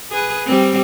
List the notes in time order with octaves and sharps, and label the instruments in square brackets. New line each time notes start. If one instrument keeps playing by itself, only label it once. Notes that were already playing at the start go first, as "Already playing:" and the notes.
[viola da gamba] G#4 B4
G3 C4